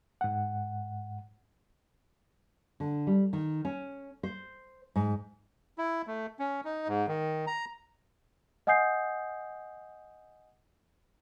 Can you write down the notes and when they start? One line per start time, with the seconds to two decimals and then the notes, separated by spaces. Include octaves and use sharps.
0.21 G#2 F#5
2.80 D3
3.07 G3
3.33 D#3
3.65 C#4
4.23 C5
4.96 G#2
5.78 E4
6.07 A3
6.39 C#4
6.65 D#4
6.88 G#2
7.08 D#3
7.47 A#5
8.67 D#5 F#5 G#5 D#6 G6 C7